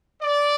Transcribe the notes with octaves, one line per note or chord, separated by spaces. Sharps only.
D5